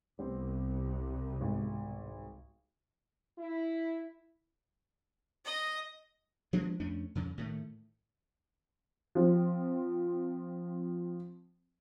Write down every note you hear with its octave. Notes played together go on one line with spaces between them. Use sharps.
C2 G3 B3 C4
G#1 B2
E4
D#5
F3 G#3 B3 D4
F2 A3 C#4 D4
F2 C#3
A2 D#3 A3
F3 C4